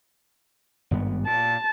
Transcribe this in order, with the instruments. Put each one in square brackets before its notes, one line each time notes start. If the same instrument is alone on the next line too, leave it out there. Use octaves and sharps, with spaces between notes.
[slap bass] G#1 G2 B3
[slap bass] A#2 [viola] A5